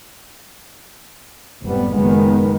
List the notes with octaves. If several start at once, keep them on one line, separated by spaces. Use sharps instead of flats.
F1 G#2 G3 B3
F#1 D#3 G#3 B3